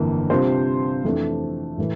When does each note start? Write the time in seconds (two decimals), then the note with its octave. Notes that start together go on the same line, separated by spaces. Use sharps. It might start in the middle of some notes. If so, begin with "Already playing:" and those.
Already playing: G1 F2 E3 A#3
0.30 C3 G3 D4 F4 C5
1.04 F2 E3 A3 D4 A4
1.78 A2 E3 A3